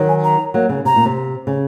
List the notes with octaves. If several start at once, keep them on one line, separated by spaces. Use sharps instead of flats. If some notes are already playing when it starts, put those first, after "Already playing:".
Already playing: D#3 F#3
G#5
A#5
F#3 A#3
C#3
C3 A#5
A#2
C3
C#3